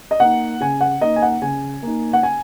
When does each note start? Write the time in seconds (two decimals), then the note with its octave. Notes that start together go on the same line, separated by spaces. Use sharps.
0.11 D#5
0.20 A#3 D#4 F#5
0.60 C#3 G#5
0.81 F#5
1.01 A#3 D#4 D#5
1.16 G#5
1.22 F#5
1.42 C#3 G#5
1.82 A#3 D#4
2.13 F#5
2.23 G#5